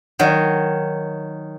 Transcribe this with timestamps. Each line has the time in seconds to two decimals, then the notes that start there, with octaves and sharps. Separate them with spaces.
0.19 D#3 F#3